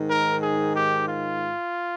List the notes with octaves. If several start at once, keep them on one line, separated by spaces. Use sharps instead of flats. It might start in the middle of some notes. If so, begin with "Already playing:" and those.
Already playing: G#2 D#3
A#4
G#4
G4
F4